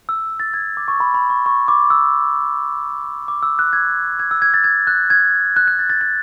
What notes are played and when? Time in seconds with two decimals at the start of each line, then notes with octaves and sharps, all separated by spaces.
0.09 E6
0.40 A6
0.54 G#6
0.77 D6
0.88 C#6
1.00 B5
1.14 B5
1.30 C#6
1.46 C#6
1.68 D6
1.90 E6
3.28 D6
3.43 E6
3.59 F#6
3.73 G#6
4.19 G#6
4.31 E6
4.42 G#6
4.54 A6
4.64 G#6
4.87 F#6
5.10 G#6
5.56 F#6
5.68 F#6
5.79 A6
5.90 A6
6.01 A6